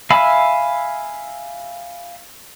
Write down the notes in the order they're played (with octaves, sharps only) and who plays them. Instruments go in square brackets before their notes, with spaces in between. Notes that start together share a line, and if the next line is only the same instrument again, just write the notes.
[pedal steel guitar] E5 F5 G#5 B5 E6